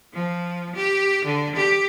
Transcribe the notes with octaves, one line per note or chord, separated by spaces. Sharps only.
F3
G4
D3
G4